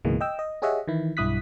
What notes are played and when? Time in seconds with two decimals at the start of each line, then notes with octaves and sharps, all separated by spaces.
0.05 C#2 G#2 B2 E3 G#3 A#3
0.21 D#5 G5 E6
0.39 D#5
0.62 G4 G#4 C#5 D#5 E5 F#5
0.88 D#3 E3 E4
1.17 B1 G2 E4 D#6 F#6 B6